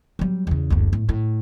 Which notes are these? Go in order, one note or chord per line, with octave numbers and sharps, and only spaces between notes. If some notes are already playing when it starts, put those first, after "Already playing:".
F#3 G3
E2 C#3
F#1 D2
A2
A2